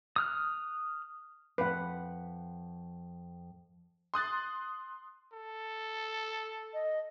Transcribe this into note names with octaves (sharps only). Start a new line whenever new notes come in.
D#6 F6 F#6
F2 B4 F#5
C6 D#6 F#6 A6
A4
D#5